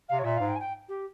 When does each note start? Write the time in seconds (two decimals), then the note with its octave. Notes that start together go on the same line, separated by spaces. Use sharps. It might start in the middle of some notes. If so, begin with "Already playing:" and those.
0.08 C3 F5
0.18 C#5
0.24 A#2 E5
0.36 G#2 F5
0.48 G5
0.55 G#5
0.59 G5
0.88 G4